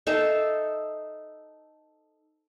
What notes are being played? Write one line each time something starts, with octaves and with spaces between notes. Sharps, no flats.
D#4 A4 C5 E5